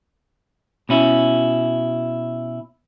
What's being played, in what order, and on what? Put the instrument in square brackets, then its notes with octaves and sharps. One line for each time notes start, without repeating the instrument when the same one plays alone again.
[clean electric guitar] B2 C#4 E4